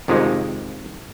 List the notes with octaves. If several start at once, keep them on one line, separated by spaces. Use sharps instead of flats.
F2 C3 D#3 F3 G#3